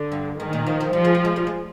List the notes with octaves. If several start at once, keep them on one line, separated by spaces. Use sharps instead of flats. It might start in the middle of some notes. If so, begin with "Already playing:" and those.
Already playing: D3
G2
G#2 D#3
A#2
F3
F3
F3 G3
G#3
G3
G#3
G3
G#3